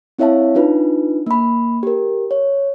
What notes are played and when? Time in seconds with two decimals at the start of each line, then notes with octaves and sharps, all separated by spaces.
0.19 C4 E4 C#5 E5 F5 A5
0.55 D4 D#4 F4 B4
1.26 A#3 B5
1.83 G4 A#4
2.31 C#5